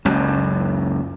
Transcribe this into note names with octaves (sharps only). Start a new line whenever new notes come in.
F#1 C#2 F#2